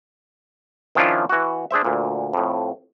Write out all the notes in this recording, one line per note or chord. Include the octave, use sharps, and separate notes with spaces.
D#3 F3 C#4 D4 E4 F4
E3 F#4
D4 G#4 C5 E5
D2 A#2
F2 A2